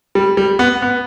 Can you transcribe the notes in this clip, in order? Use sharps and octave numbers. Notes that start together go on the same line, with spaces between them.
G3
G3
B3
B3